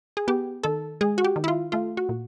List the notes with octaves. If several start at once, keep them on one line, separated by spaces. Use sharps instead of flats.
G#4
B3 G4
D#3 A4
G#3 G#4
F#4
G4
D#3
E4
F4
A3 F4
F#4
A#2